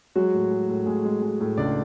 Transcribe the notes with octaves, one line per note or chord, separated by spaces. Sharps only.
F#3 G#3 F#4
A2
G#3
A2
A2 G#3 G#4
G#3
G#3
A2
C#2 D4 D5